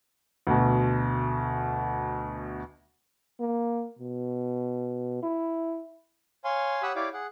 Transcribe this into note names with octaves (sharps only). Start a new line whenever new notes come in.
D2 B2
A#3
B2
E4
C#5 F5 G#5 C6
G4 C#5 F#5 B5 D#6 E6
E4 G4 C#5 D5 F5 D6
G#4 F#5